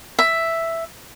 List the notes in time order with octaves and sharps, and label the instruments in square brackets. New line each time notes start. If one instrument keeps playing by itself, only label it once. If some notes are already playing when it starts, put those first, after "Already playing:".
[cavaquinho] E5